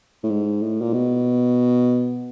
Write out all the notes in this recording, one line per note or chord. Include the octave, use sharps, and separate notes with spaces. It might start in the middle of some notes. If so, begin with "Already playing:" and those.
A2
G#2
A2
A#2
B2